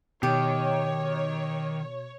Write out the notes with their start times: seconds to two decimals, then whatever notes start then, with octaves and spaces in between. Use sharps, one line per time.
0.23 B2 D#3 G4 C#5